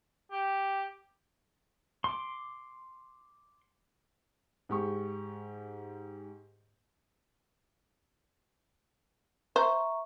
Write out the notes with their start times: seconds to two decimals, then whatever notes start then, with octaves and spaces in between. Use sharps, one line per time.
0.32 G4
2.04 C6 D6
4.69 G#2 G4 C#6
9.56 C5 E5 A#5 C#6